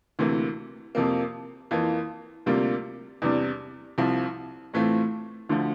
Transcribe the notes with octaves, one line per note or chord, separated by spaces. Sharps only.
D2 C3 E3 A#3
F2 C3 F3 A#3
F2 E3 A#3 F4
D2 C3 G3 A#3 F4
E2 C3 G3 D4
C2 C3 F3
A2 E3 A3 C4 F4
D2 D3 F3